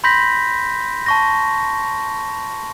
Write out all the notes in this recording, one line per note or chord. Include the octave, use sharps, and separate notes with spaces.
B5 C6 G6 A#6 B6
A5 C#6 A#6